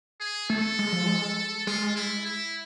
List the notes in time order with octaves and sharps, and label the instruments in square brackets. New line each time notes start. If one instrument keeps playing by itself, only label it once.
[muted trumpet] G#4
[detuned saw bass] A3 [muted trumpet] A4
[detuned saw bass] G#3
F3
G#3
[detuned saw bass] G#3 [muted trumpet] F4
[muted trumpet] E4
E4